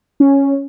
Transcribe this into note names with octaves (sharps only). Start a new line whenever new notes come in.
C#4